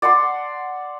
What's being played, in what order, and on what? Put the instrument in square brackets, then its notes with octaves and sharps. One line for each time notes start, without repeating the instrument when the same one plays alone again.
[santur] D5 F#5 A5 C6